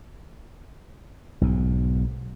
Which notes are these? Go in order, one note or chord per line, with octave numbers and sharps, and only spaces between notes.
B1 G#2